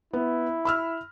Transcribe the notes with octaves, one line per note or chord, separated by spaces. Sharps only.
B3 E4
B5 E6 F6